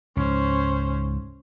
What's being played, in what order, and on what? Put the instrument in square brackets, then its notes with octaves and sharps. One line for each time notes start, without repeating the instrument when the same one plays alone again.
[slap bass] C#2 G#2 [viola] C#4 C5